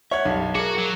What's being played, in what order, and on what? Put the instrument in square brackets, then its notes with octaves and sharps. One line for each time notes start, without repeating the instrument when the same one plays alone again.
[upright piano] C#5 F#5 G#6 [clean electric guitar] E5
[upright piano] B1 [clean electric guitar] F#2 G3
[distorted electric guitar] F#4 [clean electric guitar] G#4 A#4 [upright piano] D6
[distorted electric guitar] F#3